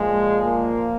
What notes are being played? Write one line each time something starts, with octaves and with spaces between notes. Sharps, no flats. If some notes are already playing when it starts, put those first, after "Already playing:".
Already playing: A#2 F3 G#3
A#3